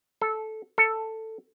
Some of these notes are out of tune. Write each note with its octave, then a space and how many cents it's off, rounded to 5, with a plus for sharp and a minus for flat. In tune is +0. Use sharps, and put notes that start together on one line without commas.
A4 -10
A4 +10